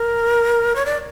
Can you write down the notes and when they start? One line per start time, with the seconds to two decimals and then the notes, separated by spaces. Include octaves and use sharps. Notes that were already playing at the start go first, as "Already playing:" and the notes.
Already playing: A#4
0.76 C#5
0.86 D5